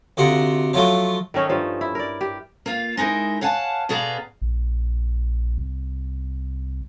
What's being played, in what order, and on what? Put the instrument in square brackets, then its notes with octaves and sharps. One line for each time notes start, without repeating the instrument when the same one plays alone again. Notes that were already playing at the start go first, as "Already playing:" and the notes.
[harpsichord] D2 C3 F4 A#4 F#5
F3 F#3 A3 F4
[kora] D#3 A3 C#4 D#4
G2 F3 C#4
E4
A#4 D5
G4
[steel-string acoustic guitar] A#3 F4 F5
G#3 D#4 E4 A#4
C#5 F5 F#5 G#5 A5
B2 B3 G#4 D5 F5 A#5
[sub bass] A#1
C2